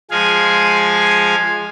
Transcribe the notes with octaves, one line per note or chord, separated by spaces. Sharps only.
F3 G#3 G#4 F5 G#5